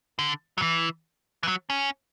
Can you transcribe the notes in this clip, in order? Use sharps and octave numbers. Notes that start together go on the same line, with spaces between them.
D3
F#3
E3
E3
F#3
C#4